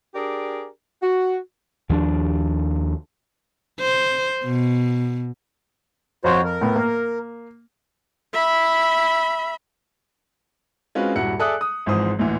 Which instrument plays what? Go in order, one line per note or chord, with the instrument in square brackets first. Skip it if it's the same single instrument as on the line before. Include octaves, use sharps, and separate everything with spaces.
[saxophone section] D4 G4 G#4 A#4 D5
F#4
[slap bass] D#2 F3 C4 D4
[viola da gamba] C5
B2
[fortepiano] F2 [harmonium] F#4 C5 C#5
[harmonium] A#4
[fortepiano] A2 B3
A#3
[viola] E5 B5
[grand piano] G#3 C4 C#4 F4 F#4 B4
D#1 G2 E4 F#4 F#5 C#7
G#4 A4 D5 E5 D#6 F#6
D#6
G#1 G#2 E3 F3 C5 D#6
A1 D2 A#2 E3